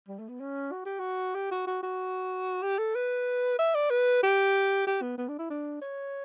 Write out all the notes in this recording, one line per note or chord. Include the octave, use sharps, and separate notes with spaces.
G3
A3
B3
C#4
F#4
G4
F#4
G4
F#4
F#4
F#4
G4
A4
B4
E5
D5
B4
G4
G4
B3
B3
D4
E4
D4
C#5